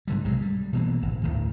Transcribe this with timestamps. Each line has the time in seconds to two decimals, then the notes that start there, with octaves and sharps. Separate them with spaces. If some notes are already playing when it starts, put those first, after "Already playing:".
0.08 G#2 D3 G3
0.24 B1 C3 F#3 G#3
0.42 G3
0.73 B2 E3 A#3
1.02 D1 G#1
1.24 D2 A2 D#3